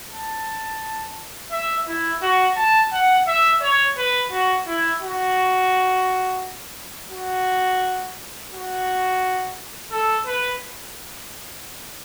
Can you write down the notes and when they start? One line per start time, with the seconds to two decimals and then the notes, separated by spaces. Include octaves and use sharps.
0.12 A5
1.51 E5
1.87 E4
2.22 F#4
2.57 A5
2.92 F#5
3.27 E5
3.61 C#5
3.97 B4
4.31 F#4
4.67 E4
5.02 F#4
7.11 F#4
8.52 F#4
9.91 A4
10.26 B4